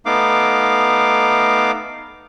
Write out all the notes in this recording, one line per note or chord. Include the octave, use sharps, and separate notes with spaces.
A3 B3 D#4 F5 D6